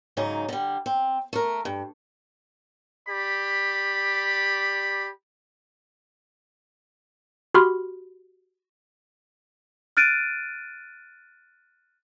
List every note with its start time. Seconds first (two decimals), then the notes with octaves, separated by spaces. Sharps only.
0.17 G#2 C#3 F#3 D#4
0.49 D3 G3
0.86 C4
1.33 A3 A#4
1.65 G2
3.09 G4 D5 B5
7.54 F#4 G4 B5 C6 F6
9.97 F6 F#6 A6 D7 D#7